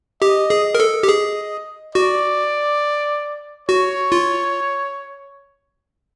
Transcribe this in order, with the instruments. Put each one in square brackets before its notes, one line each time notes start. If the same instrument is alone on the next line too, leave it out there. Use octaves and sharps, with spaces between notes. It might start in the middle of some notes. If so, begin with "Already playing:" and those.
[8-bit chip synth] G4 [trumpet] D#5
[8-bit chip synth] G#4
[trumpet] D#5
[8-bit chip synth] A#4
A4
G4
G#4
[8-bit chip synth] F#4 [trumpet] D5
[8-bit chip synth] F#4 [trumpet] C#5
[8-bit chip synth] F4